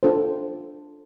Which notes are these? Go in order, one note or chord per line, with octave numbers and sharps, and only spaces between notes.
D4 F4 A4 C5